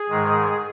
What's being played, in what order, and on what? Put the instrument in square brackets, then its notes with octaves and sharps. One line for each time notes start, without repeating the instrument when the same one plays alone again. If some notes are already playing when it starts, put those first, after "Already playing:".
Already playing: [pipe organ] G#4
G#2 D#3 G#3